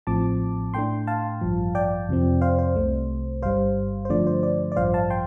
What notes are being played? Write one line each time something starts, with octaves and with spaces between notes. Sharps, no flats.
A1 A2 F3 C4 A5 D6
A2 A3 D4 G5 C6
F5 A5
A1 G2 F3
D5 G5
F2 C3 F3 C4
C5 F5
C5
C2 C3 A3
G1 G2 G3 C5 F5
C5
G2 D3 F3 A3 D4 D5
C5
D5
D5
A1 G2 F3 C5 F5
F5 A5
G5 C6